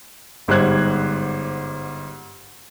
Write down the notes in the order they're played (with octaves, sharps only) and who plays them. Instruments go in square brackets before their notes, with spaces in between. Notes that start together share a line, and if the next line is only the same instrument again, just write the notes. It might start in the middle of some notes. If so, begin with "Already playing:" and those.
[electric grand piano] G1 G#2 G3 C5 F#6 G#6